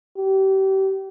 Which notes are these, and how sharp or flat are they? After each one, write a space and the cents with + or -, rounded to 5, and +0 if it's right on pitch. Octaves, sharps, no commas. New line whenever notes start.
G4 -30